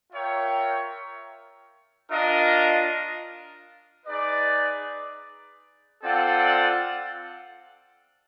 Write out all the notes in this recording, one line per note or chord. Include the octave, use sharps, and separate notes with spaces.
F4 A#4 C#5 E5 G5
D4 F4 A#4 D#5
D#4 G#4 B4 D5
C4 F4 A4 D5 F#5